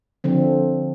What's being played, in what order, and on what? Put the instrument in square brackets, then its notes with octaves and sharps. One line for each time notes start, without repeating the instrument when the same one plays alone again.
[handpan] D3 F3 C4